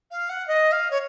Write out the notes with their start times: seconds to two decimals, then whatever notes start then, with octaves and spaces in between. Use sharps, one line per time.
0.11 F5
0.29 F#5
0.47 D#5
0.72 F5
0.90 C#5